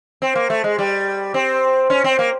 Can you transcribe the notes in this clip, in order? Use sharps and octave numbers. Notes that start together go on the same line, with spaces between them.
C4
A#3
A3
G#3
G3
C4
C#4
C4
A#3